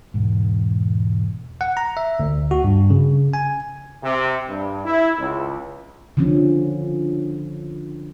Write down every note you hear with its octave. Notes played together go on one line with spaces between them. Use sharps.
E1 G#2
F#5
A#5
E5
D2
F#4
G2
C#3
G#5
C3
G2
E4
C#2
D3 F3 C#4